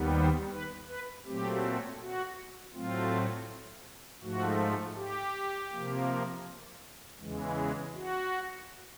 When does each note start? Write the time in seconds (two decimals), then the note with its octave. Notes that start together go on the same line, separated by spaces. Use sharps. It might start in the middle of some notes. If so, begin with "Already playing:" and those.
Already playing: D#2 D#3 G3 B3
0.14 C5
0.52 B4
0.88 B4
1.25 A#2 F#3 A3 C4 G4
2.00 F#4
2.74 A2 F#3 A3 C4 F4
4.22 G#2 F3 A3 F#4
4.96 G4
5.71 C3 F3 A#3
7.20 E2 C#3 E3 G#3
7.94 F#4